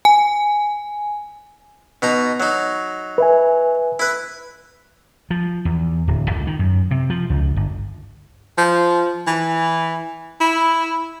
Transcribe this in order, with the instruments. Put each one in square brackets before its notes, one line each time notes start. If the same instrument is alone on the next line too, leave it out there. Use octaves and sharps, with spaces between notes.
[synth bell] G#5
[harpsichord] B2 D#4 A#5
F#3 D#4
[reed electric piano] B4 E5 G#5
[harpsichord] E4 B4
[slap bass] F3
E2
D1
C#2
D#3
F#2
C3
F3
C#2
G1
[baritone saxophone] F3
E3
E4